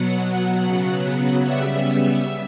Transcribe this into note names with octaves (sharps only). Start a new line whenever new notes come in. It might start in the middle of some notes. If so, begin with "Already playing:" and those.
Already playing: B2 F#3 B3 F#5
C#3 F#3 B3
C#3 G3 B3 E5